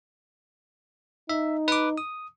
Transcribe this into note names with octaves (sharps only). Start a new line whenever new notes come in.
D#4 E5
B4 D6
D#6